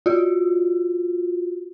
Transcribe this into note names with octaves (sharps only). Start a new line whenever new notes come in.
F4 F#4